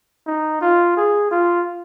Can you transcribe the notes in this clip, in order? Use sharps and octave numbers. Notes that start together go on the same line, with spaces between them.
D#4
F4
G#4
F4